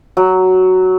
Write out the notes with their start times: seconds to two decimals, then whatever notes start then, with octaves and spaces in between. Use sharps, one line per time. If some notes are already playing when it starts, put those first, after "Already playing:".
0.17 F#3